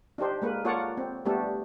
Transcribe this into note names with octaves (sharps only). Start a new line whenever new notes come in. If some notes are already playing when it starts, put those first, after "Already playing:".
D4 D#4 G4 C5
G#3 A#3 B4
A#3 F4 A4 C#5 D5 F#5
C4
G3 A3 B3 D4 G4 A4